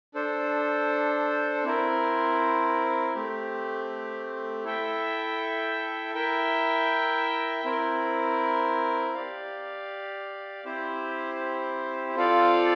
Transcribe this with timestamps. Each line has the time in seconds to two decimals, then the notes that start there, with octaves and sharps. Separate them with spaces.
0.14 D4 A4 C5
1.64 C4 E4 A#4
3.15 A3 C4 G4
4.64 E4 A4 E5 G5
6.14 E4 A#4 E5 G5
7.64 C4 E4 A#4
9.14 G4 D5 F5
10.65 C4 E4 G4 C5
12.15 C4 F4 A4 D5 F5